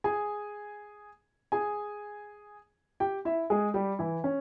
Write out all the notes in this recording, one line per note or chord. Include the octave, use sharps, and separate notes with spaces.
G#4 G#5
G#4 G#5
G4 G5
E4 E5
G#3 G#4
G3 G4
E3 E4
C#4